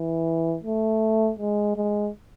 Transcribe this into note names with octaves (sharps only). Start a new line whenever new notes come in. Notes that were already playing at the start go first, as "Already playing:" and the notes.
Already playing: E3
A3
G#3
G#3